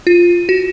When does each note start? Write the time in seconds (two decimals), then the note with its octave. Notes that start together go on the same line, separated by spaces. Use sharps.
0.07 F4
0.49 F#4